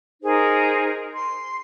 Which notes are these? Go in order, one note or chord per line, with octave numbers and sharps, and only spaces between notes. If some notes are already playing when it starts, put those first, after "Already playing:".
D#4 G#4 A#4 C5
C6